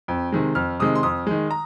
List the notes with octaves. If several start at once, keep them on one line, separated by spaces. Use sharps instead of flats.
F2
C3 D#3 G#3
F2 F6
C3 D#3 G#3 D#6
C6
F2 D#6
D#3 G#3
A#5